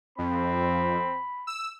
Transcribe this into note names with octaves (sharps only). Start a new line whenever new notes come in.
F2 C4 B5
E6